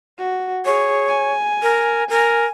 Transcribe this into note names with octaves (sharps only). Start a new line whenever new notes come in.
F#4
G#4 C#5
G#5
A#4
A#4 G#5